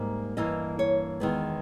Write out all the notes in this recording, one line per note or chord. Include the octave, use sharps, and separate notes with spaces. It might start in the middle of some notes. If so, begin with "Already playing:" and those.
Already playing: G#2 G3 A#3
G2 E3 A#3 D#5
C#5
E2 D#3 G#3 B3